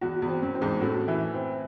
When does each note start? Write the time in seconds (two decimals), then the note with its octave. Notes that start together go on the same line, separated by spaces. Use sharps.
0.01 E2 F#4
0.22 E2
0.28 C4
0.42 F#2
0.55 C4
0.61 E2 G#2
0.81 F#2 A2 F#4
1.08 E3
1.34 C4